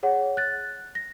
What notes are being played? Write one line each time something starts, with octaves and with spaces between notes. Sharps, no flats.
G#4 C#5 F#5
F#6 A6
A#6